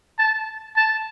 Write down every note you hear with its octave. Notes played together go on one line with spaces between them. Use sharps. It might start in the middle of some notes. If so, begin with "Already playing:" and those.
A5
A5